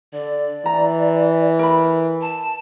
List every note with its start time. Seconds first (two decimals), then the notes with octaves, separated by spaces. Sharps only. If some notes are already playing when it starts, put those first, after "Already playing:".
0.13 D3 D5
0.66 E3 A#5
1.59 A#4 B5
2.21 A5